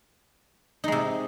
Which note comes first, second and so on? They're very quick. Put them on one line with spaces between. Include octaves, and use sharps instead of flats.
D#4 G#3 C3